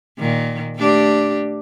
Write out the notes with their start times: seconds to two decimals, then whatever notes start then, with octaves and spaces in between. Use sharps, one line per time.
0.19 A#2 D#3
0.76 A3 D4 G4